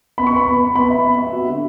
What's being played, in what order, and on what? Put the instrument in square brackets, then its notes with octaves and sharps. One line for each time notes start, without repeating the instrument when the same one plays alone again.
[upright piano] B3 [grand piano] B5
[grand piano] C#6
[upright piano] B4
[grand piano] B5
[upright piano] B3
B4
[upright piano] B3 [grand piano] B5
[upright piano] E5
B3
E5
F#4
D3